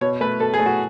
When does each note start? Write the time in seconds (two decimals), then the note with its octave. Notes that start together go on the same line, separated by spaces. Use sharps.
0.01 B2 C#5
0.21 A3 B4
0.40 B2 A4
0.54 G#4
0.59 A3
0.66 F#4